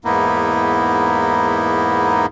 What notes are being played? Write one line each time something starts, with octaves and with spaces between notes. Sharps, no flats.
E2 G#2 A#3 B3 D#4 E4